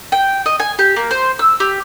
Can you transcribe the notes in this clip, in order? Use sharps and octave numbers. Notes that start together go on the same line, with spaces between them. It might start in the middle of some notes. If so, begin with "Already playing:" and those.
G5
D#5
G#5
G4
A#3
C5
E6
G4